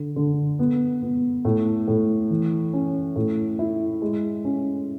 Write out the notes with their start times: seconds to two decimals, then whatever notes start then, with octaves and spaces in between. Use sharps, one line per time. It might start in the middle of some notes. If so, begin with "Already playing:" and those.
Already playing: D3
0.16 D3
0.59 B3
1.02 B3
1.45 A2
1.88 A2
2.30 E3
2.73 C#4
3.16 A2
3.59 E4
4.02 G#3
4.45 C#4